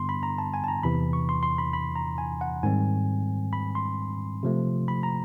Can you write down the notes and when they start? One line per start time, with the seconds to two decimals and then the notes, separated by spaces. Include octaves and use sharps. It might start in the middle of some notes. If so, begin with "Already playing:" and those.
Already playing: G2 D3 G3 B3 C6
0.09 B5
0.23 A#5
0.38 A5
0.54 G#5
0.64 A5
0.68 A#5
0.83 E2 C3 E3 B5
1.13 C#6
1.29 C6
1.43 C6
1.58 B5
1.73 B5
1.96 A#5
2.18 G#5
2.41 F#5
2.63 G#2 D#3 G3 C4 G#5
3.53 B5
3.75 C6
4.43 C3 F3 A3
4.88 B5
5.03 A#5